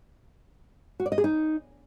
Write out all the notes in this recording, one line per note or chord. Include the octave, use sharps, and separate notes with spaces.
F#4
D5
D#5
G#4
D#4